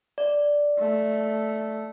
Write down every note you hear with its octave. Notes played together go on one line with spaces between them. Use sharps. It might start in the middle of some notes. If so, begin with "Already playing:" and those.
D5
A3